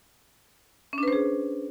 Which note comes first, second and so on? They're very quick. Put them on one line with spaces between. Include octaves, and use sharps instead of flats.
C#4 D4 B4 C5 G#4